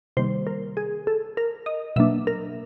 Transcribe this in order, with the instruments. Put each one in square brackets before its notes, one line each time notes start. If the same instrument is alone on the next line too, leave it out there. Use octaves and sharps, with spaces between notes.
[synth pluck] C3 D#3 G3 A#3 C5
A#4
G#4
A4
A#4
D#5
B2 F#3 A#3 D4 E5
A#4